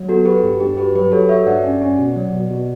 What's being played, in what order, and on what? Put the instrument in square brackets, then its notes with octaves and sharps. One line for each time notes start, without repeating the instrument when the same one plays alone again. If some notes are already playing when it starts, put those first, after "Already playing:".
Already playing: [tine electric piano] F#3
[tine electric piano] B3 [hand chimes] F#4 A4
[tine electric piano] F#4 [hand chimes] G4 B4
[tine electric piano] G2
[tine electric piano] G2 [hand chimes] G4
[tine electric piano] F#4 [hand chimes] G4 B4
[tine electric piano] F#3 [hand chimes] G4 B4
[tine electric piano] F#4 [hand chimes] A4 C#5
[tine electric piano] F#4 [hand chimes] C#5 E5
[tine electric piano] G2 [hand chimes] D5 F#5
[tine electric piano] C#4
C#4
B2
F#3
B2
B2